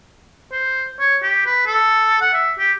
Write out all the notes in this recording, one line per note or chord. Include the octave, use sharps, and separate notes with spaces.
C5
C#5
G4
B4
A4
F#5
E5
G4